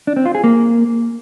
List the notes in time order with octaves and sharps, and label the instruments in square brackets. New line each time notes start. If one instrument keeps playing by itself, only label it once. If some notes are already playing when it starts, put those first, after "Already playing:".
[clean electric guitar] D4
C4
F4
G#4
A#3